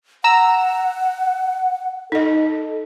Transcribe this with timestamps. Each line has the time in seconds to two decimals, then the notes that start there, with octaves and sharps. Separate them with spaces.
0.24 F#5 A#5 E6
2.12 D#4 A4 D#5